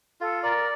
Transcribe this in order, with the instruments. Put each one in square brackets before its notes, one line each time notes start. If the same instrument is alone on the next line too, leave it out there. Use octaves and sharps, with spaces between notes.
[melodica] F4 [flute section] A4
[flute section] A#4 [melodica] D5